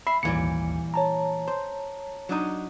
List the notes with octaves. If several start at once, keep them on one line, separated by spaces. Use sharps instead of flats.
E5 B5 C7
G#1 D#2 A#2 E3 G3 C#7
C#5 A5 A#5
C5
F#3 D4 D#4